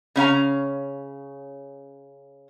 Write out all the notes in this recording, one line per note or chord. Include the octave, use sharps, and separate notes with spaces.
C#3 C#4 F5 A#5